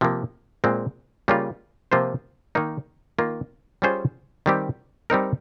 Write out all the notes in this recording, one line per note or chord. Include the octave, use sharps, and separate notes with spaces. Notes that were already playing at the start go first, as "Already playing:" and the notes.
C3 F3 A#3
A#2 G#3 C4
C#3 G3 A#3 F4
C3 F3 A#3 F4 C5
D#3 A#3 D#4
D#3 A#3 F4
G3 C#4 F4 G#4 C5
D#3 G3 C4 G4
G3 C4 D#4 A#4